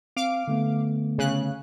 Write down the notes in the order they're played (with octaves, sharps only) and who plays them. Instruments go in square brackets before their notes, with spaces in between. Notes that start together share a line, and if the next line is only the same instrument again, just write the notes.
[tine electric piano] C4 [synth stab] F5 D6
[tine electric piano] D3 A3 B3
[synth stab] C#3 F#6